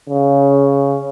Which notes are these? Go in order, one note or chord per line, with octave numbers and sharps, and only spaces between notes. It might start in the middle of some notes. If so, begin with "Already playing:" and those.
C#3